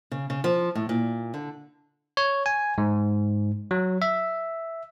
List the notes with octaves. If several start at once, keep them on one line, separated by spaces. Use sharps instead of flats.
C#3
C#3
F3
A2
A#2
D3
C#5
G#5
G#2
F#3
E5